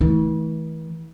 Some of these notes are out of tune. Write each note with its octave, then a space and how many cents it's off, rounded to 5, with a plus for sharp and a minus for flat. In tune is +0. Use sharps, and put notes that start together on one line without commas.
E3 -40 A3 -25